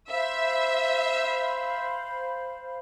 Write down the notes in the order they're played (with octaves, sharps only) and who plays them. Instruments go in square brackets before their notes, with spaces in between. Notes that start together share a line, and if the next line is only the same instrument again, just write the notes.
[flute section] C5 F5 B5 [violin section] E5